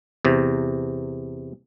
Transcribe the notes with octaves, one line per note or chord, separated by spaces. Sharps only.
E2 C3